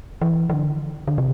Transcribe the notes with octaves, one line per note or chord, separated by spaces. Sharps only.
E3
E3
D3
D3
C3